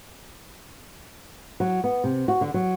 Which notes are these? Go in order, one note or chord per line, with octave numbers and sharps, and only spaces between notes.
F#3
B3
C3
F#4
D3
F#3